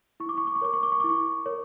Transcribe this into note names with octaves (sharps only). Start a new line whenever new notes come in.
E4 C#6
D6
C#6
D6
C#6
A#4 C#5 D6
C#6
D6
C#6
E4 D6
C#6
A#4 C#5